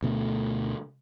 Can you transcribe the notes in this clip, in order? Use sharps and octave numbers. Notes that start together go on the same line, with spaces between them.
D2 B2 A3